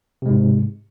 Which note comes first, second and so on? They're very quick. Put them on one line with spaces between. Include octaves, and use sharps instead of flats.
C3 G#3 G#2